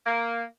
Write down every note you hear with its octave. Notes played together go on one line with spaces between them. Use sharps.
A#3